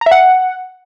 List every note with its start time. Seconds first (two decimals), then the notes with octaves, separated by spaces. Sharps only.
0.01 A#5
0.06 E5
0.11 F#5